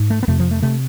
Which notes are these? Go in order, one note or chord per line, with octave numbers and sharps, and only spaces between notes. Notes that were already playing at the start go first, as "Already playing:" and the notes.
Already playing: G#2
A3
B3
F2 C3 A3
F3
A3
C3 A3